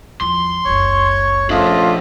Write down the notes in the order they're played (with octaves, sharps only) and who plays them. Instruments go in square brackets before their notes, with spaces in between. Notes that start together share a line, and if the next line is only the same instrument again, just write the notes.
[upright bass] E2 F3 [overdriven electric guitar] C6
[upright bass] F#1 C#2 [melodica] C#5 C#6
[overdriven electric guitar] F3 D4 [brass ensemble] A3 C#4 F4 [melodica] D#5 E5